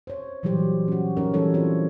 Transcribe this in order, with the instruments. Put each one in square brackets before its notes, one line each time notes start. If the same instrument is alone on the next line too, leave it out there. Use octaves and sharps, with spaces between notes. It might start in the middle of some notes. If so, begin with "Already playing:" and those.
[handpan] C5 C#5
A#2 E3 F#3 G3 G4 C5
C#4 F#4
A#2 C#4 D#4 A#4
E3 G3 C#4 D#4 A4 C#5
C4 E4 F4 A4 C5 C#5